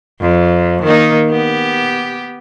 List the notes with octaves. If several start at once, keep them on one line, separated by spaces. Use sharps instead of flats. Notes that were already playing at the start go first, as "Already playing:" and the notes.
F2
D#3 A#3 D#4
B3 G4